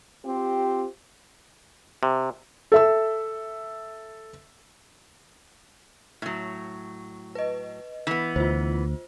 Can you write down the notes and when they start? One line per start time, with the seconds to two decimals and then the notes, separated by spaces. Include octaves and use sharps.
0.25 C4 F4 G4
2.03 C3
2.72 A4 E5 E6
6.22 A2 F#3
7.35 B4 D#5
8.07 E3 B3
8.36 D2 F4 C5